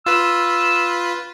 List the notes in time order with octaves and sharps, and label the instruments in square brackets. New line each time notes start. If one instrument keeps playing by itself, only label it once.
[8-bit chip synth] F4 B4 [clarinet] E6